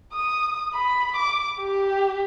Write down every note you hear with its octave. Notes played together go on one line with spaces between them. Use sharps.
D#6
B5
D6
G4